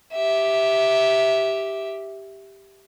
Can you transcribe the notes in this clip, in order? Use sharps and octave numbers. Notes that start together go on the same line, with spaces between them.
G4 E5